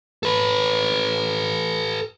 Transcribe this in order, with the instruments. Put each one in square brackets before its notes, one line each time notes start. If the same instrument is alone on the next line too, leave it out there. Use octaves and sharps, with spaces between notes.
[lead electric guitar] A4 B4